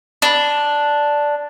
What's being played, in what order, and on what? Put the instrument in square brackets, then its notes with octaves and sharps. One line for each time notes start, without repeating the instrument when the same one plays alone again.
[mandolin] D4